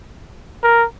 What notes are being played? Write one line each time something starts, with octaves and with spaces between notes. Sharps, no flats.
A#4